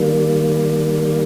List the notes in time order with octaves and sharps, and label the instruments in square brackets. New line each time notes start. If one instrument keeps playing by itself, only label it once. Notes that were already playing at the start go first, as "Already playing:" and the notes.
Already playing: [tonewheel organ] D#3 G3 A#3